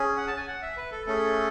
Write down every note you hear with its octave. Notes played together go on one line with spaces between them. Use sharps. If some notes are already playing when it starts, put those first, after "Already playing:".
Already playing: C#4 G#4
F#5
A5
G#5
F#5
E5
B4
A4
A3 C#4 G#4 A4